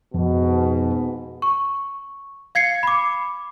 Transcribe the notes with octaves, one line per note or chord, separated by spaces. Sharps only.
F2 G#2 B2
C#6
F5 G#6 C7 C#7
B5 D6